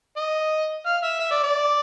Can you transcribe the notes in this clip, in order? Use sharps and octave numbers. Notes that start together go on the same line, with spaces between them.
D#5
F5
E5
E5
D5
D5